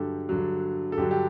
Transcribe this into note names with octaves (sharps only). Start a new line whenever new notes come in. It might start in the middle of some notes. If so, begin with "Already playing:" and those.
Already playing: G2 D3 F#3 G4 A4
G2 D3 F#3
A4
G2 D3 F#3 G4
G4